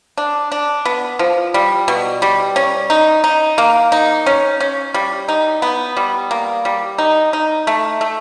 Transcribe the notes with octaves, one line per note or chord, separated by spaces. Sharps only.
D4
D4
B3
F3
G3
B2
G3
C#4
D#4
D#4
A#3
D#4
C#4
C#4
G3
D#4
B3
G3
A#3
G3
D#4
D#4
A3
A3